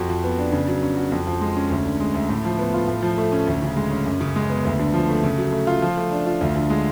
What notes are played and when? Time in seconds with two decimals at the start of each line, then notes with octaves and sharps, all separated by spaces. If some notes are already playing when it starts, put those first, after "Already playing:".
Already playing: F2 F#4
0.09 F3
0.24 B3
0.38 D4
0.52 C#3
0.68 F#3
0.83 C#4
0.97 F#4
1.12 F2
1.27 F3
1.41 G#3
1.56 C#4
1.70 D2
1.86 D3
2.00 G#3
2.14 D2
2.29 A2
2.45 F3
2.59 B3
2.74 F4
2.88 A2
3.02 F3
3.18 A3
3.32 C#4
3.47 D2
3.62 C#3
3.77 G#3
3.91 C#4
4.06 F#2
4.21 C#3
4.36 G#3
4.50 B3
4.65 D2
4.79 D3
4.94 F3
5.09 A3
5.24 C#3
5.38 F#3
5.52 A3
5.67 F4
5.82 F3
5.97 A3
6.11 D4
6.26 F4
6.41 D2
6.56 D3
6.70 G#3